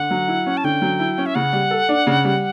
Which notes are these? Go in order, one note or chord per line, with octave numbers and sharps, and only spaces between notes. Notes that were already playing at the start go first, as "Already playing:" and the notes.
Already playing: D3 F#5
F#3
E4
C#4
A5
D3 G5
F#3
E4
C#4
E5
C#3 F#5
G3
A4
D4
C#3
G3